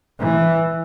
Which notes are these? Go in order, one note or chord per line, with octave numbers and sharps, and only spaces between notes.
E3